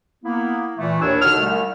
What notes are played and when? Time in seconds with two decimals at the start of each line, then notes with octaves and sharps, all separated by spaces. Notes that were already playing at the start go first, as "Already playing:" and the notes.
0.24 A#3 B3 E4
0.77 A#2 E3 A3
1.00 D#2 A2 D#3 D4 C#5 E6
1.20 B2 D3 D#4 E6 F6
1.39 C2 G3 A3